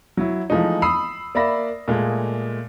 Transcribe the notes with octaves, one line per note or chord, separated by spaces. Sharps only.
F#3 E4
E3 F3 G#3 A3 D#4
B5 D#6 E6 C7
A#3 D5 E5 B5 A#6
A#2 G#3 A3